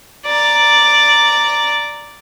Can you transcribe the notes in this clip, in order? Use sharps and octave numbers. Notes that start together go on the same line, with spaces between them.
D5 A#5